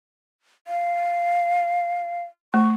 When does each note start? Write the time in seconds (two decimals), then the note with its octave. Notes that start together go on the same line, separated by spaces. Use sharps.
0.67 F5
2.54 A3 C#6